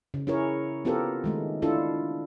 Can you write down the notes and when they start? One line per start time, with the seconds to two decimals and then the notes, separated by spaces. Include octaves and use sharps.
0.14 C#3
0.27 C#4 E4 G#4 A#4 C#5
0.85 B3 C4 F4 G4 A4 A#4
1.24 D#3 G#3 A3
1.62 D4 E4 F4 A4